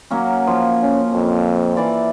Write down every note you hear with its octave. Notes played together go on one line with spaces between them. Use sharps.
F#3 A#3 C#4
F3
C#4
F2
E3 D5